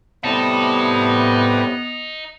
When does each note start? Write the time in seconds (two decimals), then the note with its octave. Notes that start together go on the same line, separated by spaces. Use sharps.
0.24 A2 C3 G3 B3 D#4 B4 A5